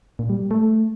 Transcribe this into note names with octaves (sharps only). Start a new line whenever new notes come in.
A#2
G3
A3